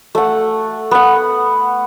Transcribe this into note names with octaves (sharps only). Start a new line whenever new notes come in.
A3 F#5
B3 F#5